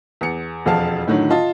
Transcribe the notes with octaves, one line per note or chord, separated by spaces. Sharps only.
E2 C#7
E1 F2 F3 F5 A5
A2 D3 D#3 F#3
F4 D#5 A5